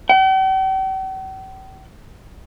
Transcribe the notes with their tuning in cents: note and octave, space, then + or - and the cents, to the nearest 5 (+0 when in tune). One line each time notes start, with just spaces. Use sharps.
G5 -45